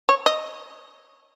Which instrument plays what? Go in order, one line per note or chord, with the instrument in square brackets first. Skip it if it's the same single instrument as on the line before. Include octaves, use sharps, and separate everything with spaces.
[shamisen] C#5
D#5